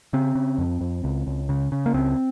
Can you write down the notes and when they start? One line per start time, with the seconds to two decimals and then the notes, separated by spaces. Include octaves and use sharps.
0.13 C#3 C4
0.35 C#3
0.58 F2
0.81 F2
1.04 C#2
1.27 C#2
1.49 C#3
1.72 C#3
1.86 A#3
1.94 C#2 C4